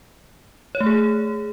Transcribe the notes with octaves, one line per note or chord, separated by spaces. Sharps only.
C#5
A3
G#4